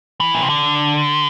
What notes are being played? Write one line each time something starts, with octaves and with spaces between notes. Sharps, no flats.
E3
A#2
C3
D3